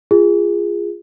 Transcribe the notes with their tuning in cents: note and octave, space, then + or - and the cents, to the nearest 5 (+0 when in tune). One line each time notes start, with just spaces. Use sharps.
F4 -10 G#4 -20